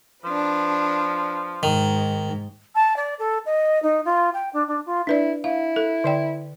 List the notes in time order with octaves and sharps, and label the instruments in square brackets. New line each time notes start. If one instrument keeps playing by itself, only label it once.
[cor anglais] F3 [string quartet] D4 B4
[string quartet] G#2 [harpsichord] D#3
[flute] A5
D5
A4
D#5
D#4
F4
G5
D4
D4
F4
[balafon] D4 B4 D5 [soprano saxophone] E4
[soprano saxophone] E4 [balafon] F5
[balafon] A4
D3 D5 G5